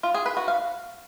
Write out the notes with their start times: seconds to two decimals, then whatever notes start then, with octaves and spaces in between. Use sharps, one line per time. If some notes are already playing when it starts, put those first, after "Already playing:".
0.03 F4
0.14 G#4
0.26 B4
0.37 F#4
0.48 F5